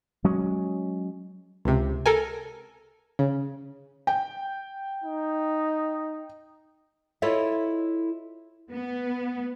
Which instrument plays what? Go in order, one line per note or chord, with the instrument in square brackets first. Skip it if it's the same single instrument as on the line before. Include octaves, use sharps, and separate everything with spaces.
[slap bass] F#3 G#3 C#4
[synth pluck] C#2 C3
A4 A#4 G#5
C#3
[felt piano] G5
[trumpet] D#4
[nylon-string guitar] E4 F4 A4 C#5 D#5 E5
[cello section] B3